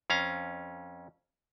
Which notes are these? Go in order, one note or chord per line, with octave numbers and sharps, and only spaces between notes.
F2 C#4 F5 A#5